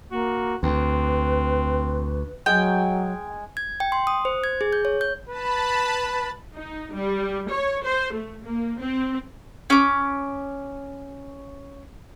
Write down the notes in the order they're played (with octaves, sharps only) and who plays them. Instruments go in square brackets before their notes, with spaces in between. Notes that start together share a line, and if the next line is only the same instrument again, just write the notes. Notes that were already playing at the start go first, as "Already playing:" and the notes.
[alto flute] A#3 [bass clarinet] F#4
[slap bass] D2 [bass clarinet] C4 [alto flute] B4
[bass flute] F#3 [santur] G#3 G#5 [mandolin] G5
[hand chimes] G#6
G5
C6
D#6
C5
G#6
G#4
G6
C#5
G6
[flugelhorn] B4 [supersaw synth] A5 B5
[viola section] D#4
G3
C#5
C5
A3
A#3
C4
[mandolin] C#4 D6